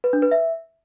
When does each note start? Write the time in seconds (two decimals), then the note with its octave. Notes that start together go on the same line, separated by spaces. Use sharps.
0.04 B4
0.13 D4
0.22 B4
0.31 E5